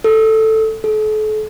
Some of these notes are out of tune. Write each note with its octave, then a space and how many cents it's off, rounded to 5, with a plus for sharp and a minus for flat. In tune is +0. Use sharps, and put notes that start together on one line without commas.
A4 +5
A4 -40